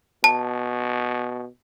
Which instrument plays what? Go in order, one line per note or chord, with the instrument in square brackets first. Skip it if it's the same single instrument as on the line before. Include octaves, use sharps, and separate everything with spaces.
[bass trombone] B2 [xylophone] A5